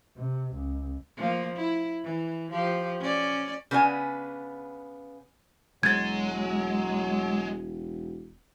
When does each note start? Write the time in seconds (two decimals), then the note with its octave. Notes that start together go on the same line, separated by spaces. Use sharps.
0.17 C3
0.54 C#2
1.17 F3 A#3
1.56 E4
2.03 E3
2.51 F3 G4
3.00 C#4 D5
3.71 C#3 B3 D4 G#5
5.83 E1 F#3 G#3 G#6 A6